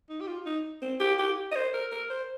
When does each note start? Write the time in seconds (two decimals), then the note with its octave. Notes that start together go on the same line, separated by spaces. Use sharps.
0.09 D#4
0.21 G4
0.27 F4
0.46 D#4
0.82 C4
1.00 G4
1.19 G4
1.51 D#5
1.56 C5
1.74 A#4
1.92 A#4
2.10 C5